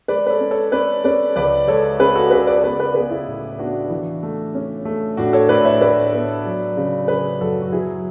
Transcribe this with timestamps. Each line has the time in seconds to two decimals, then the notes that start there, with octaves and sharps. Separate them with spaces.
0.08 G#3 B4 D5
0.26 B4
0.29 A4 C#5
0.41 C#4
0.51 A4 C#5
0.72 C#4 B4 D5
1.04 C#4 B4 D5
1.36 C#2 B4 D5
1.67 G#3 A4 C#5
2.00 C#4 G#4 B4
2.15 F#4 A4
2.31 C#3 G#4 B4
2.47 B4 D5
2.63 B3 B4 D5
2.79 B4 D5
2.94 B3 G#4 B4
3.11 E4 G#4
3.27 A2
3.59 B3 D4 F#4
3.90 E3
4.23 A3
4.55 C#4
4.85 A3
5.17 A2 D4 F#4
5.33 A4 C#5
5.49 A2 B4 D5
5.65 C#5 E5
5.81 A2 B4 D5
6.13 B3
6.45 F#3
6.77 C#3
7.08 C#3 G#4 B4
7.40 F#2 F#4 A4
7.62 F#4
7.72 F#3 E4 G#4